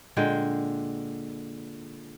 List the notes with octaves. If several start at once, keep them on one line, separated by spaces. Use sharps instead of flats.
A#2 D3 G#3 G5